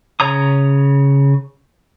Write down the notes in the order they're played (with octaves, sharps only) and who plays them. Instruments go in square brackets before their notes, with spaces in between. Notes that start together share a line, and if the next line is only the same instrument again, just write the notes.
[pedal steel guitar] C#3 C#5 A#5 D#6